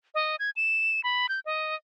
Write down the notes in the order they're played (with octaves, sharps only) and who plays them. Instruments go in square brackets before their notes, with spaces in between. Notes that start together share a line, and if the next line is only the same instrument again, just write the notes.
[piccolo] D#5
G#6
E7
B5
G6
D#5